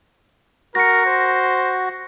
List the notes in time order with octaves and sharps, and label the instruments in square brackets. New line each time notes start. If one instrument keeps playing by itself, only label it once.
[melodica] F#4 [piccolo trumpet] A#4 [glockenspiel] A#6 C#7
[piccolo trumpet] C5